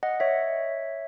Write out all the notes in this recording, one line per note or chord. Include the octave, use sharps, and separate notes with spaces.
D#5 F#5
C#5 E5